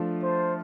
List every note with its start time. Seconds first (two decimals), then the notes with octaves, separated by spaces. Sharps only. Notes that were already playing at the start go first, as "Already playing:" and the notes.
Already playing: F3 A3 D4 F4
0.23 C5